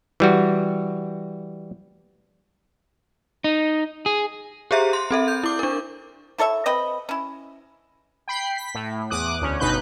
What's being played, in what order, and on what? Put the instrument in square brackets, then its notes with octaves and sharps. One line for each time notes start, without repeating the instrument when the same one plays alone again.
[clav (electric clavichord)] E3 G3 F#4
[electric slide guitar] D#4
G#4
[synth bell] G4 G#4 C5 E5 A#5
C6
C4 A4 E5
G6
E4 D6
D4 A#4
[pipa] E4 A4 C#5 E5
C4 B4 D#5 B5
C#4 E4
[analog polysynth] G5 B5 C7
B6
A2
E2 D6 D#6 F#6
D2 C#4
G1 B2 D#4 B4 F#6 G6